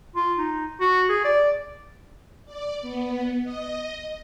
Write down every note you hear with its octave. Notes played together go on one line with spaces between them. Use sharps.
F4
D#4
F#4
G#4
D5
D5
B3
D#5